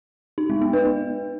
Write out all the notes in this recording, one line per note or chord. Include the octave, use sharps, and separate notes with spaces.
D#4
G#3
B3
B4
B3